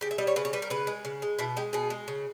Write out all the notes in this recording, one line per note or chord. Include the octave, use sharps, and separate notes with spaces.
C#3 G4
E5
G3 D#5
C#5
C#3 B4
C#5
G3 B4
A#4
C#3 B4
G#3
C#3
G#3
B2 E4
G#3 G4
B2 G#4
G#3
C#3